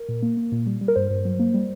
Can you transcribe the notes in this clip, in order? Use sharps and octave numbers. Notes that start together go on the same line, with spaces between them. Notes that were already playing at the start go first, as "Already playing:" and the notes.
Already playing: A#4
A#2
A#3
A#3
A#2
G3
G3
A#4
G2 C5
G2
F#3
A#3
G3